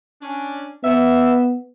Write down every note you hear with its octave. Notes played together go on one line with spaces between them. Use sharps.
C#4 D4
B3 E5